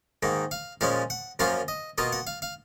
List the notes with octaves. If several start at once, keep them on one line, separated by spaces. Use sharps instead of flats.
G#2 D#3 A#3
F5
A#2 F3 G#3 C#4 F5
F#5
F#2 F3 A#3 C#4 F4 F5
D#5
B2 A#3 F4 D#5
F#5
F5
F5